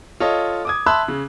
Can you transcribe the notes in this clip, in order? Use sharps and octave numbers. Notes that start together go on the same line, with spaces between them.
F4 A4 C#5 D#5
D6 D#6 G#6
E5 A5 B5 C6 E6 F#6
C#3